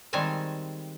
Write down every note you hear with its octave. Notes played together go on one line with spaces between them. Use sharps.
D#3 G3 G#3 C4 G#5 A5